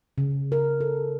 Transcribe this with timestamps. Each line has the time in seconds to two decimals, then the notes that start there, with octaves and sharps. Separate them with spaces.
0.18 C#3
0.52 A#4
0.81 A4